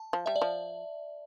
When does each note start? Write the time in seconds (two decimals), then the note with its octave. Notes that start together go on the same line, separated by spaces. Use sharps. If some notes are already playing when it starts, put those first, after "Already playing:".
Already playing: A5
0.13 F3
0.26 G3 E5
0.36 D5
0.42 F3